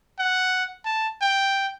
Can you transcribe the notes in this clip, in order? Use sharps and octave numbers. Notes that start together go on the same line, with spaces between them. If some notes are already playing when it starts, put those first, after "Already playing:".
F#5
A5
G5